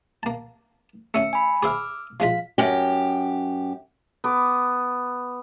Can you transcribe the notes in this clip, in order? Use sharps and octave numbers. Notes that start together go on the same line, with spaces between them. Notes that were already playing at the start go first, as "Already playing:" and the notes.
A#3 A5
A3 C#4 F5 E6 C#7
G#5 B5
G#4 C5 F5 D6 E6 F6
F3 G#3 F4 F5 B6
F#2 G4
B3 D6